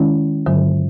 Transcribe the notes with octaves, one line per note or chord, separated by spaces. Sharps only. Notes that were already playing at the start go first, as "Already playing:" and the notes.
Already playing: D#3 G#3 C#4 E4
G2 D3 F#3